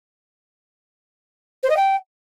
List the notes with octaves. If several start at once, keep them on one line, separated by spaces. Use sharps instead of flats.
C5
D#5
G5